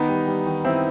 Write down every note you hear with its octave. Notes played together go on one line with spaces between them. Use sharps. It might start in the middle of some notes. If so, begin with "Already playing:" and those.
Already playing: D#3 B3 D#4
G3
G3
D#3
D#3 C4 E4